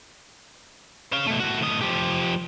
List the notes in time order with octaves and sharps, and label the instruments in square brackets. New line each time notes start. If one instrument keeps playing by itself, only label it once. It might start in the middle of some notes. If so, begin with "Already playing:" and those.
[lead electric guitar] C#4 F5
B2 A3
A2 F#4
A2 D#5
F3 G4